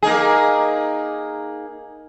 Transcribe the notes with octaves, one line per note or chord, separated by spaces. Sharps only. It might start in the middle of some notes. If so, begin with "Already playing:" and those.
A#3 D#4 G#4